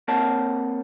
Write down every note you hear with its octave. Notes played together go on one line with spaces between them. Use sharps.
A#3 C4 A#4 C#5 F#5 A5